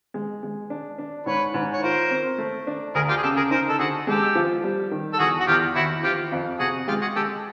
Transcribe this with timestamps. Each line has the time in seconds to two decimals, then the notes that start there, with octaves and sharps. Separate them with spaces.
0.14 G#3
0.43 G#3
0.70 D4
0.98 D4
1.26 G#2 B4 C#5
1.54 G#2
1.73 C#5
1.82 F4 A#4 C5
2.11 C4
2.38 A3
2.67 D4
2.95 D2 G#4 A#4
3.09 F4 G4
3.16 G#4
3.23 C#3 G4 A4
3.36 G#4 A#4
3.51 D#4 A#4 C5
3.69 A4
3.79 D3 F#4 G#4
4.07 G#3 G4 A4
4.35 F3
4.64 G3
4.91 D#3
5.13 A4
5.19 E2 F#4 G#4
5.40 F#4
5.47 E2 F4 G4
5.75 D#2 E4 F#4
6.03 F3 F4 G4
6.32 F2
6.59 C3 F#4 G#4
6.87 G#3 F4 G4
7.02 F#4 G#4
7.16 G#3 G4 A4